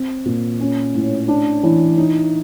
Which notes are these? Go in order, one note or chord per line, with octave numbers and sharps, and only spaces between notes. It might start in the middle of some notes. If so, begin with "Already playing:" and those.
Already playing: C4
A#2
C#4
A2
D4
E3
D#4